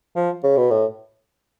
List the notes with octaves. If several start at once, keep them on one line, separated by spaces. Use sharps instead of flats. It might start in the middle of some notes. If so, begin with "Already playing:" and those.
F3
C#3
B2
A2